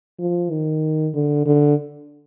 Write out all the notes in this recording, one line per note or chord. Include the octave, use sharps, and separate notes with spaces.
F3
D#3
D3
D3